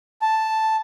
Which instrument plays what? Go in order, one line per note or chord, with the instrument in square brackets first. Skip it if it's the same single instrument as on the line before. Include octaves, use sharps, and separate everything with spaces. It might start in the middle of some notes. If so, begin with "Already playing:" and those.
[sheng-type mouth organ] A5